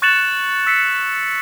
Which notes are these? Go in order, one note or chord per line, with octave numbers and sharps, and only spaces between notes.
C#6 F#6 A6 C#7 E7 F#7
E6 B6 C#7